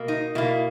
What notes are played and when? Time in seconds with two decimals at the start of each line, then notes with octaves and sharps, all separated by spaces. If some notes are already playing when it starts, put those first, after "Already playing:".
Already playing: B2 A#3
0.08 D#4
0.35 B2 A#3 E4